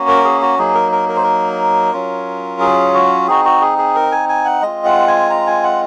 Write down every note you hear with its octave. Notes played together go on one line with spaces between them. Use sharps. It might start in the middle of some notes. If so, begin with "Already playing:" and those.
Already playing: A#3 C#4 F#4
A#4
G#4
F#4
F#3 A#3 D#4 G#4
A#4
A#4
A#4
C5
A#4
F#3 C#4 F4
G#4
F#4
C4 D#4 F#4 G#4
F#4
G#4
G#4
A#4
G#5
G#5
F#5
G#3 C4 F4 D#5
F#5
G#5
A#5
G#5
F#5